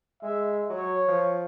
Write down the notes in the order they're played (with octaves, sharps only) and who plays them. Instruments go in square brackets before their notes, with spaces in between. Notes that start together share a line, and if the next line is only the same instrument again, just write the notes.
[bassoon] G#3 [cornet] E5
[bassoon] F#3 [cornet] C#5
[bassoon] F3